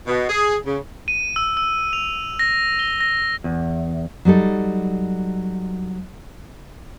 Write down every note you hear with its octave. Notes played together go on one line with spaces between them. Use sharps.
B2
G#4
C#3
D#7
E6
E6
F7
A#6
G7
A#6
E2
F#3 G3 D#4 A4